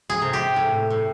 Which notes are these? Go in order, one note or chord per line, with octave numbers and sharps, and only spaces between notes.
G#4
C3
G4
A2
A2